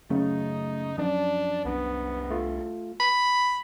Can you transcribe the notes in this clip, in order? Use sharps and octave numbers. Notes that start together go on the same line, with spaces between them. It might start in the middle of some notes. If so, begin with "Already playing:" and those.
F#2 C#3 A3 D#4
F#2 F3 D4
C2 B3 D4
A3 F4
B5